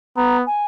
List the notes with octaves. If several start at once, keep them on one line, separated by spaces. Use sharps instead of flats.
B3 A#5
G#5